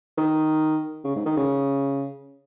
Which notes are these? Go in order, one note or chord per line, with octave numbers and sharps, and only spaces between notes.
D#3
C#3
G#2
D#3
C#3